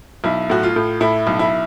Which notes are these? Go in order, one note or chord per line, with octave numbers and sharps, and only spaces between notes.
B1 E4
A2 F#4
F4
A2
A2 E4
B1
E4